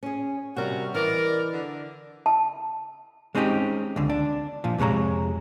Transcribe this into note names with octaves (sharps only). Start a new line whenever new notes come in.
C#4 G#4
C3 G3 C#4 F#4 A#4
E3 A#4 D5 D#5
D3
A5
G#3 C4 C#4 D#4 F#4 G4
C#2 D3
D4
A#2 F3
F2 C3 G#3 C#5 A#5